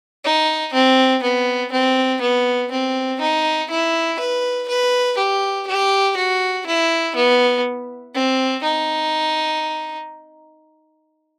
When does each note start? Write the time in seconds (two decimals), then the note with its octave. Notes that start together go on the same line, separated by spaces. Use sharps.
0.24 D#4
0.73 C4
1.23 B3
1.72 C4
2.21 B3
2.71 C4
3.21 D#4
3.70 E4
4.19 B4
4.68 B4
5.18 G4
5.67 G4
6.16 F#4
6.67 E4
7.15 B3
8.14 C4
8.63 D#4